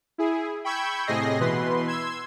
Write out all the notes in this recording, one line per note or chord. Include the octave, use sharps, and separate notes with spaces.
E4 G#4
G5 B5 C#6 E6 G6 G#6
A2 C3 G#4 D#5 A#6 C7
B2 E3 B4 C6
C6 E6 G#6